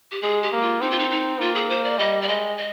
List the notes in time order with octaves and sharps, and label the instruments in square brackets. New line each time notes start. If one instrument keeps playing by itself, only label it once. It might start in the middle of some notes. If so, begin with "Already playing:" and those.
[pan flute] G4
[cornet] G#3 [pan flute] G#4
[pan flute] G4
[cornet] A#3
[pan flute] F4
[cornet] C4 [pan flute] D#4
[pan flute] F4
D#4
D#4
[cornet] A#3 [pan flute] F4
[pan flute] G#4
C5
D5
[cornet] G3 [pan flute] D#5
[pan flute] D5
[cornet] G#3 [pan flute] D#5
[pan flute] D#5